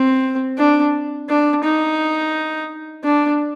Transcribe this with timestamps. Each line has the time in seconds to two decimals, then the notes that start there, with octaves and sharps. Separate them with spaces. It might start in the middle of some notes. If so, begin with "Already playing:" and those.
Already playing: C4
0.58 D4
1.29 D4
1.64 D#4
3.04 D4